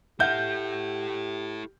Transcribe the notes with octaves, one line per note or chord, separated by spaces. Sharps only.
E4 G4 A4 E5 F#5 F6 G6